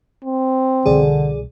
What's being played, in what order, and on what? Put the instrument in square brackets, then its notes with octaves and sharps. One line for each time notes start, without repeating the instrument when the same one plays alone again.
[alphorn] C4
[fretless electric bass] C2 B2 E3 [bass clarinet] D3 [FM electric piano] G#4 D5